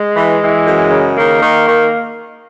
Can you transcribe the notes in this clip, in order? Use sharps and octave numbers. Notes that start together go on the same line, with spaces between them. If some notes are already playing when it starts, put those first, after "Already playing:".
Already playing: G#3
E3
E3
F#2
C#3
D#3 A#3
D#3
D#3